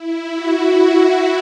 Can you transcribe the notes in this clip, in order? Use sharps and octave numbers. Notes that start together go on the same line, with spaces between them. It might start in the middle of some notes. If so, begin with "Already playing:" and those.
Already playing: E4
F#4